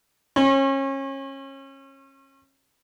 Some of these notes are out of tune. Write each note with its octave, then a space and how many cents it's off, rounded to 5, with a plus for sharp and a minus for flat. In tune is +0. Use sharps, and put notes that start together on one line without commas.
C#4 -30 C#5 -40